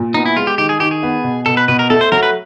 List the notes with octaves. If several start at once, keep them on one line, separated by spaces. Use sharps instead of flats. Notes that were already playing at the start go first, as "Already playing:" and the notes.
Already playing: A#2
B3 D#4
E4
G#3 F4
G4
D#3 G4
G#4
D#3 G4
G#4
B3
B2
B2 A4
B4
B2 B4
A#4
A3 A4
C5
F#3 A#4
B4